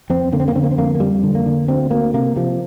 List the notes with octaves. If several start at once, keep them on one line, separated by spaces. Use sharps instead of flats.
F2 C4
D3 A#3
C4
A#3
D3 C4
A#3
C4
F2 A#3
A#3
F2 G3
D3
A#3
D3
D2 C4
D2 A#3
C3 A#3
C3 F3